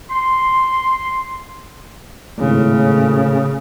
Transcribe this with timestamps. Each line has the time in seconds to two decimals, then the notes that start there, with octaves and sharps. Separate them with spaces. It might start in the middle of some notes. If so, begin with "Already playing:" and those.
0.10 C6
2.39 G#1 A2 C#3